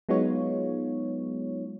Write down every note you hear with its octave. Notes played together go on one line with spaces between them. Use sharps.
F#3 G#3 B3 D#4 F4 C#5